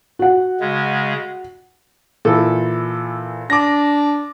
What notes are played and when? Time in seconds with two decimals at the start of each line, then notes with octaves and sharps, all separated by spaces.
0.19 F#4 F#5
0.61 C#3 G#3
2.25 A#2 E3 E4 A4
3.50 D4 D6 A#6